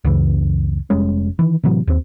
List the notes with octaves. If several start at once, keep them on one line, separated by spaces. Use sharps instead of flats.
C#2 F#2 C#3 E3
F1 G3 G#3 C#4
D#3 E3
A2 C3 E3 F#3
D#2 C4